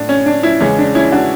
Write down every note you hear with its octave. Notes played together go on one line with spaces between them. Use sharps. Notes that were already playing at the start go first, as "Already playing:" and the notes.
Already playing: A2 D4
C#4
D4
C#4 E4
E2 C#3 G#3 C#4
D4
C#4 E4
D4 F#4